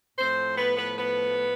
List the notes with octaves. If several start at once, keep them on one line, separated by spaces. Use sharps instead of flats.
A2 F3 A3 C4 C5
B3 B4
B3 B4
B3 B4